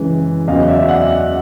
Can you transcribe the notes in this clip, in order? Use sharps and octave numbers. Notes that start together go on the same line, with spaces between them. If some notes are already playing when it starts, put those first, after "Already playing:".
Already playing: F#2 C#3 E3 G#3
E2 C#3 F#3 D#5 F5
D5 E5
E5 F#5